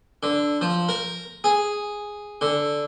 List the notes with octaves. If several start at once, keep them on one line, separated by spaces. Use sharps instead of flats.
D3
F3
A#4
G#4
D3